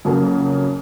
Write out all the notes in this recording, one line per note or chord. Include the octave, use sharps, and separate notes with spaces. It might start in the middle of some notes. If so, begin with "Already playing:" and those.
F2 C#3 F#3 A#3